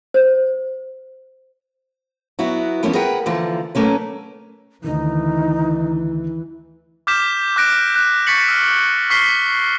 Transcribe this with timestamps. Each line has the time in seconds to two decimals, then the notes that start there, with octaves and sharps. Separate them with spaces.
0.14 C5
2.39 F#3 B3 E4 F#4
2.83 E3 F3 A#3 B3 C#4
2.94 G#4 A#4 B4 F#5 G5
3.26 D3 E3 F3 A#3
3.75 F#3 A3 A#3 C#4 B4
4.84 D2 D#3 E3 D#4
7.07 D6 F6 G6 B6 E7
7.56 D6 F#6 A#6 D7
7.96 F#6
8.27 C#6 A6 B6 C#7 F#7
8.48 E6 F6
9.10 C#6 F6 B6 C7 G7